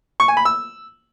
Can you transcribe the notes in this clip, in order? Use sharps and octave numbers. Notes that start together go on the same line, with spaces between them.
C#6
G#5
B5
E6